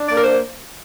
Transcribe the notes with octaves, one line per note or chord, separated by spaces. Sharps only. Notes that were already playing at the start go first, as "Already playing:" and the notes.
Already playing: D4
A#3 D5
A#4
C5